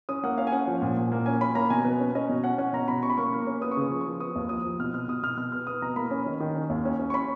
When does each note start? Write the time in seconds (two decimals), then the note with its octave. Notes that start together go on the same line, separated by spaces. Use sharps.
0.09 C#4 D#6
0.23 A#3 F#5
0.38 C#4 F5
0.47 G#5
0.52 C#4 F#5
0.67 F3
0.82 A#2
0.97 A#2
1.12 A#3
1.26 C#4 G#5
1.41 C#4 B5
1.55 A#3 A#5
1.70 B2 G#5
1.85 B2 B4
2.00 C#4
2.15 C#4 D#5
2.29 B2
2.44 C#4 F#5
2.58 C#4 F#5
2.73 B2 A#5
2.88 B2 B5
3.03 C#4 C#6
3.10 B5
3.17 A#3 C#6
3.33 A#3
3.47 C#4
3.61 B3 D#6
3.71 C#6
3.77 C#3 D#6
3.90 F3
4.01 F3 C#6
4.20 B3 D#6
4.36 D#2
4.49 F3 D#6
4.64 F3
4.80 B2 F6
4.94 B2 F6
5.08 B2 D#6
5.23 B2 F6
5.37 B2 F6
5.52 B3 F6
5.67 B3 D#6
5.82 B2 A#5
5.96 A#3 B5
6.11 C#4
6.26 D#3
6.40 D#3
6.55 C#4
6.70 D#2
6.85 C#4
6.99 C#4
7.10 C#6
7.14 C#4 B5